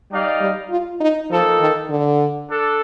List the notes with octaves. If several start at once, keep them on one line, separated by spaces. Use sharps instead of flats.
G3 D#4 G4 D5 F5
G3
F4
D#4
F3 A#3 D#4 A4
D#3
D3
D4 A4